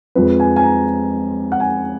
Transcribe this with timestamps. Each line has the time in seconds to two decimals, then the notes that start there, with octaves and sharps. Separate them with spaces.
0.15 F2 F3 G#3 B4
0.40 G#5
0.56 G#5
0.63 A#5
1.52 F#5
1.60 G#5